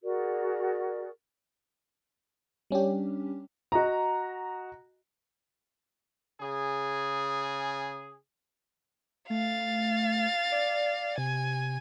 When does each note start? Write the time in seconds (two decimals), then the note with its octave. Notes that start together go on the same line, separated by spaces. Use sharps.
0.04 F#4 G#4 A#4 D5
2.71 G3 C#4 D4 G4
3.72 F#4 D#5 A#5
6.40 C#3 G#4
9.30 A3 F5 A6
10.52 D5
11.18 C3 G#5